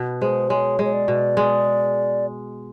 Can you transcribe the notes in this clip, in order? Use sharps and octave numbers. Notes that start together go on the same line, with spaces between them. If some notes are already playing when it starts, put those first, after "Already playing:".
Already playing: B2 B3
G#3 C5
G#3 C#5
G#3
C#5
D5
B2
G#3